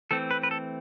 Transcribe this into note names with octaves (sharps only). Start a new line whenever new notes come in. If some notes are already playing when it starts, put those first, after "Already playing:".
E3 A3 C4 A4
B4
B4
A4